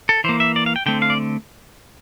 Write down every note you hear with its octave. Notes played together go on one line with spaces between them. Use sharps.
A4
E3 A#3 C5
E5
D5
F5
G5
D3 A3 C4 G5
F5
D5